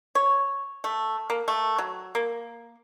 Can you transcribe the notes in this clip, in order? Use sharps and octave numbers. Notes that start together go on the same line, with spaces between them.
C#5
A3
A#3
A3
F#3
A#3